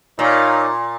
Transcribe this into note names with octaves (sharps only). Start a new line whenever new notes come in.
A#2 D#4 A#4 C#5 F5